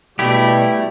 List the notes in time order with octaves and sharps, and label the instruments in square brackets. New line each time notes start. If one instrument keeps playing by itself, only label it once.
[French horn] B2 [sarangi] G3 [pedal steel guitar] A3 E4 G4